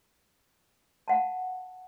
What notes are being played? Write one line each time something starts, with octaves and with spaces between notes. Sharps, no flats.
F5 F#5 A5